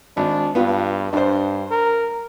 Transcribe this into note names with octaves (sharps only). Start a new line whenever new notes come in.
G#1 D4
G2 B3 F4
G2 D4 C5
A#4